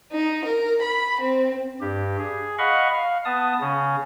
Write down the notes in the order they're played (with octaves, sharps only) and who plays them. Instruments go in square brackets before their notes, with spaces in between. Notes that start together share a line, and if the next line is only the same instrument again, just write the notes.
[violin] D#4
A#4
B5
C4
[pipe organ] G2 G4
G#4
D#5 F5 F#5 B5 C#6
F5
B3 A5 D#6
C#3 C#4